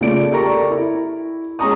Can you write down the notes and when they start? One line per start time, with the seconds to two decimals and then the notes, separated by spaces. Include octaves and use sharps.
0.01 C#3 A3 F4 D5 D7
0.31 G4 A4 A#4 D5 A#5 C#6
0.70 E4
1.59 G#3 C#4 A#5 C#6 D#6